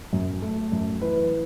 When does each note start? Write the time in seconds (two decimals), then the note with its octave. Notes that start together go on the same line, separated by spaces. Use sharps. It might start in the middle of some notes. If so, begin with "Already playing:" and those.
0.13 F#2
0.42 A3
0.72 F#2
1.01 E3 B4